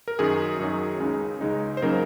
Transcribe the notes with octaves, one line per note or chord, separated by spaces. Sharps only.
A#4
F#2 D#3 F#3 G#4
F#2 D#3 F#3
C#2 C#3 G#3 D#4
C#2 C#3 G#3 D#4
C5
C#3 F#3 A#3 D#4 A#4